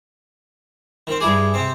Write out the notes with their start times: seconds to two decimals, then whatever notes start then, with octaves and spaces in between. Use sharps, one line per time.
1.07 D#3 C4
1.20 G2 E4 G#4 D6
1.54 C3 C4